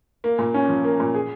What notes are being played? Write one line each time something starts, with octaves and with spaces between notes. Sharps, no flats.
A#3
A#2
C#4
F3
A#3
A#2
G#4